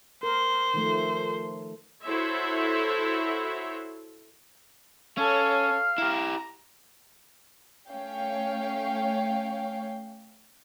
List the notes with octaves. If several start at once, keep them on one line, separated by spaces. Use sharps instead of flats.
A#4 C5
D#3 F3 A3
E4 F#4 A4 C5 C#5 E5
C#4 A4 C#5 F5
E4 G4 A#5
A3 C#4 C#5 F5 G5